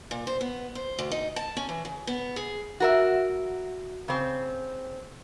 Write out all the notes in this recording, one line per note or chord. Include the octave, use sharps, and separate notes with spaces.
A#2
C5
B3
C5
D2
D#4
A5
C#4
E3
C#3
B3
G#4
F#4 A#4 E5
C#3 C4